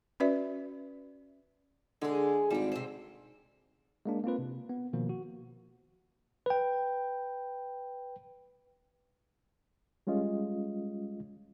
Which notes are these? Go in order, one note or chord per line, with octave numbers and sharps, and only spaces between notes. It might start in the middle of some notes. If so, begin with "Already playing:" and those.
C#4 F#4 B4 D5 E5
D3 G#3 G#4
G#1 G3 D4
C3 C5
G#3 A#3 D4
A#3 C4 F4 B4
C3
B3
B2 D#3 F3 A#3
F#4
B4 G5
G3 G#3 C#4 F4 D#5